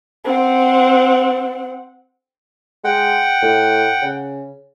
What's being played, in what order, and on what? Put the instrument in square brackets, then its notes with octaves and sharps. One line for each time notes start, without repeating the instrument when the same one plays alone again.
[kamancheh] C4 F#5
[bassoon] G#3 [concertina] F#5 G5
[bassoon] A2
C#3